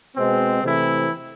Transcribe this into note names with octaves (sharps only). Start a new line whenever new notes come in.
B2 G#3 C4
C3 E3 A3 E4